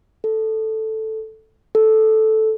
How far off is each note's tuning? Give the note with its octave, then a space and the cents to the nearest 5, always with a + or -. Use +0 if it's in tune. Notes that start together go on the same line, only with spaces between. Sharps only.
A4 +0
A4 -5